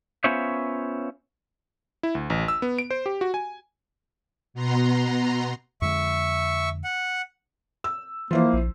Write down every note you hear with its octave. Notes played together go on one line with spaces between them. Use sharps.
B3 C#4 F4 C5 C#5 E5
E4
D2
A1
E6
B3
D7
C5
G4
F#4
G#5
B2 B3 A#5 C6
F2 D3 G#3 E5 C#6
F#5
E6
E3 F3 A#3 E4 C5
A#1